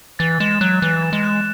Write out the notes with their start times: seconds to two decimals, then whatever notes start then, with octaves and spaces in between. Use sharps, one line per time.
0.19 E3 A6
0.40 G#3 E7
0.61 F#3 F#6
0.82 E3 F#6
1.03 A6
1.13 G#3
1.24 E7